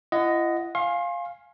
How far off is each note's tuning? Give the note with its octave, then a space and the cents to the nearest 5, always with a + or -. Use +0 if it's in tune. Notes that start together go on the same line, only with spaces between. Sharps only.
E4 +45 D#5 +0 F#5 +0
F5 +0 G#5 +0 C6 +40